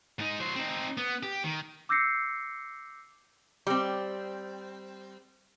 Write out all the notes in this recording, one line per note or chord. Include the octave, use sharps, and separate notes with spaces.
G#2 D#4
F#3 C5
C4 D#4
B3
G4
D#3
D6 E6 G6 A#6 C7 C#7
G3 C4